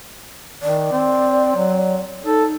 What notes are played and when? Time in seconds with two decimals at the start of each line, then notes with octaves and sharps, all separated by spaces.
0.62 D#3 D5
0.92 C4
1.56 F#3
2.25 D#4 A4